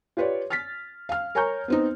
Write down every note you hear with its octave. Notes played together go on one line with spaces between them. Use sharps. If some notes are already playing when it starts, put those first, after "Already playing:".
F4 G4 B4 C#5 D5
F6 A6 B6
F5 F6
A#4 C#5 G#5 A#5 C#6 G6
B3 C4 D#4